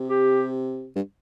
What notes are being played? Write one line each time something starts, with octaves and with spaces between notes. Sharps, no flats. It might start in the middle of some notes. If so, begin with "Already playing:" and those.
Already playing: C3
G4
G2